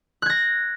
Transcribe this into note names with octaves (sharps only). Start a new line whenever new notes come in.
F#6 G#6 A#6